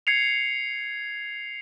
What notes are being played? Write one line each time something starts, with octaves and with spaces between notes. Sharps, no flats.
G#6 C7 C#7 F7